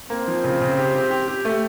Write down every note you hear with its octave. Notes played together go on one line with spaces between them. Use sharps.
A#3 C4
F3
C#3
C#3
G4
G4
G4
G4
A3